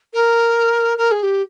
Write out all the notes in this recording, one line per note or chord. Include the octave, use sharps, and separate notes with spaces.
A#4
A#4
G#4
G4